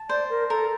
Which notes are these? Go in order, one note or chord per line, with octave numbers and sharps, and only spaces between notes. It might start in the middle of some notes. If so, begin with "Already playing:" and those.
Already playing: A5
C5 D5
A#4
A4 A#4